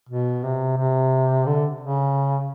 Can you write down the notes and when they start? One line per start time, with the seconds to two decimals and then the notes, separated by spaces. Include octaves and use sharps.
0.09 B2
0.44 C3
0.77 C3
1.46 D3
1.80 C#3